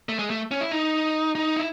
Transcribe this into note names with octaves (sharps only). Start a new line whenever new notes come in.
A3
G#3
A3
C#4
E4
D#4
D#4
E4